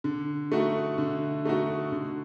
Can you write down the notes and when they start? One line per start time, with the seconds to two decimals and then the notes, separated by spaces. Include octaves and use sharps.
0.04 D3
0.52 A3 D#4 F#4
0.98 D3
1.45 A3 D#4 F#4
1.92 D3